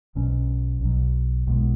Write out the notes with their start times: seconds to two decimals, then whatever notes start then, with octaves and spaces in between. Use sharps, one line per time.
0.15 B1 B2 F#3 C#4
0.80 B1 B2 F#3
1.47 B1 B2 G#3 B3